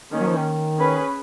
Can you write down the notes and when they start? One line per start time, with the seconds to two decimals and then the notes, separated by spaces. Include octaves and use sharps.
0.12 D#3 A#3 C#4
0.20 F#3
0.28 F3
0.37 D#3
0.77 C#4 G#4 B4